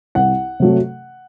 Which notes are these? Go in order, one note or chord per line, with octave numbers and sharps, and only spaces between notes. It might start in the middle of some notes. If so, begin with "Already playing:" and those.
C2 F#5
C3 F#3 A3